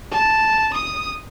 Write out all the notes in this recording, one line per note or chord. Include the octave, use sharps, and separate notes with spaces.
A5
D#6